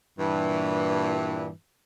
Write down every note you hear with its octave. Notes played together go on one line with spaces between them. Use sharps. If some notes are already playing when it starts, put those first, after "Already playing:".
G2 A#2 E3